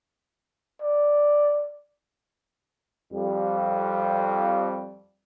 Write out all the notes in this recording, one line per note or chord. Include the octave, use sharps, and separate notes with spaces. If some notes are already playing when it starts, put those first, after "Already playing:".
D5
F2 G3